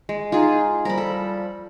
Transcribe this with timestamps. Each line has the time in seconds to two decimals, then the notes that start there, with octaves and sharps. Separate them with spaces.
0.09 G#3
0.32 D#4 F4 G#4
0.85 F3 G3 A#4 B5
0.98 A4